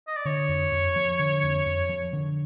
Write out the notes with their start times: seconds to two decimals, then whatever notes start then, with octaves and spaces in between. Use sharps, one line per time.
0.07 D#5
0.16 D5
0.25 D3 C#5
0.49 F2
0.72 F2
0.96 F3
1.19 D3
1.43 F2
1.66 F2
1.89 F3
2.13 D3